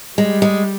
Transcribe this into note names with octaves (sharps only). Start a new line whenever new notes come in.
G3 G#3
G#3